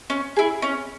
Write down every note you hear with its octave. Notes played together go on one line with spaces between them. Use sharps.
C#4
E4 G#4
C#4